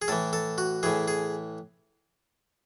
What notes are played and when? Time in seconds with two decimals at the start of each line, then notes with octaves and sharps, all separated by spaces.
0.02 G#4
0.08 A2 E3 A4
0.33 A4
0.58 F#4
0.83 A2 E3 G#4
1.08 G#4